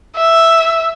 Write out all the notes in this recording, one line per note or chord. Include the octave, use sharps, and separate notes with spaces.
E5